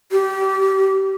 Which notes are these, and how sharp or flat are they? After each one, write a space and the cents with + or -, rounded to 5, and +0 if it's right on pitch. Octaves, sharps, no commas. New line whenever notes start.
G4 -25